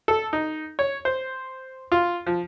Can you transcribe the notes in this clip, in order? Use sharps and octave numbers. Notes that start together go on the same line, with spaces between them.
A4
D#4
C#5
C5
F4
F3